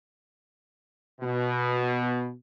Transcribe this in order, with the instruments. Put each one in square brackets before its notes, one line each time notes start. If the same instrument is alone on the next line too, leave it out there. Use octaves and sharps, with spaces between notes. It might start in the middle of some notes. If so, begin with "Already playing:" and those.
[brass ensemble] B2